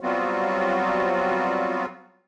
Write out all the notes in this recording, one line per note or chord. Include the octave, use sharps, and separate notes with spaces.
F#3 G3 B3 C4 F4 F#4